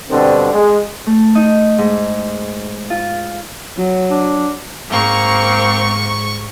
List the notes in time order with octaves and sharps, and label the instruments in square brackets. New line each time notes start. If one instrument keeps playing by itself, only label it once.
[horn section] G2 B2 D3 C4
G#3
[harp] A3
D#4
G#2
F4
[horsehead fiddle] F#3
[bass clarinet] D4
[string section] G#2 C#6 [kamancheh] A#3 C4